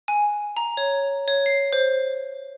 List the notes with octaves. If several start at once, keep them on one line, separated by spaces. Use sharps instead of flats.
G#5
A#5
C#5
C#5
C7
C5